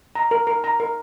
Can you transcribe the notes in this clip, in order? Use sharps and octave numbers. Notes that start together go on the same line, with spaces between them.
A#5
A#4
A#4
A#5
A#4